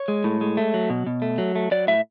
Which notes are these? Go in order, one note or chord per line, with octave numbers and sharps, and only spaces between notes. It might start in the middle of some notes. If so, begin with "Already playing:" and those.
Already playing: C#5
G#3
A2
G#3
A3
F#3
B2
B2
A3
F#3
A3
F#3 D5
A2 E5